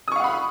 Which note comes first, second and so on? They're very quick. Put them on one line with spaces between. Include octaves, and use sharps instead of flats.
D#6 C#6 F5 F#5 B5